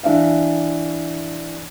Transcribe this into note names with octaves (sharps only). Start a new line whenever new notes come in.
E3 D4 E5 F5